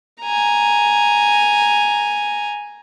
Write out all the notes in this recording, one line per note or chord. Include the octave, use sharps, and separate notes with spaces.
G#5 A#5